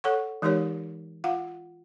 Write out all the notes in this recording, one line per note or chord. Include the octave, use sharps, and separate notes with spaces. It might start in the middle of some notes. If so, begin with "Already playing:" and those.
A4 C#5 F#5 C#6
E3 G#3 D#4 G4 A#4 C#5
F4 F5 F#5